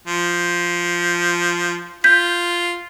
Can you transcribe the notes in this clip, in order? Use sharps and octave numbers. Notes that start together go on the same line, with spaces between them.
F3
F4 G6 B6